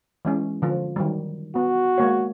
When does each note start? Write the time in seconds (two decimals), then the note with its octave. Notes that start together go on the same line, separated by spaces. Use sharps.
0.25 E3 G#3 C#4
0.62 D3 F3
0.96 D#3 F#3 G3
1.55 B3 F#4
1.98 G#3 A#3 C#5